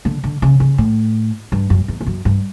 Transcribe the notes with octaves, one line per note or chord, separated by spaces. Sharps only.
D3
D3
C#3
C#3
A2
G2
F#2
E2
E2
F#2
G2